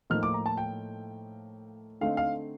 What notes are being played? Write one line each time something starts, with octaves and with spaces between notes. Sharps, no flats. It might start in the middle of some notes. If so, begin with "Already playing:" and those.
A2 F3 A#3 D#4 F6
D6
A#5
A5
G5
D3 A3 C4 D#4 F5
F5